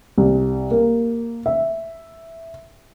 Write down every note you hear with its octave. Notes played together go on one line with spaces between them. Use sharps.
C2
A#3
E5